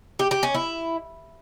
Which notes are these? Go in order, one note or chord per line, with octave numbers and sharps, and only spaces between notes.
G4
G4
C#4
E4